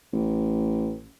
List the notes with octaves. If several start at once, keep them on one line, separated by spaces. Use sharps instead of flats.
A1